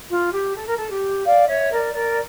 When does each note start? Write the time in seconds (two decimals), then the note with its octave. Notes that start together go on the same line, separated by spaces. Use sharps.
0.10 F4
0.33 G4
0.56 A4
0.67 A#4
0.77 A4
0.91 G4
1.25 D5 F5
1.48 C#5 E5
1.71 A#4 D5
1.94 A#4 D5